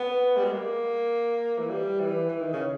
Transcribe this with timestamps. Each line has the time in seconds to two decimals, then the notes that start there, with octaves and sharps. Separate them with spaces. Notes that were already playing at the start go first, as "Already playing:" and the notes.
Already playing: B3
0.37 G3
0.44 G#3
0.52 A#3
1.59 E3
1.70 G3
2.00 E3
2.29 E3
2.41 D#3
2.53 C#3